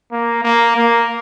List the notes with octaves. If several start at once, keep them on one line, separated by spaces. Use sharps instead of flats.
A#3
A#3
A#3